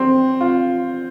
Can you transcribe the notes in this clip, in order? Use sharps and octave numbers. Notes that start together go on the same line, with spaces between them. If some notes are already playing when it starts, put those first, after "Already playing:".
Already playing: C4
F4